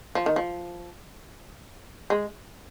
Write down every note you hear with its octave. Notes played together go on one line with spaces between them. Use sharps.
F3
D#3
F3
G#3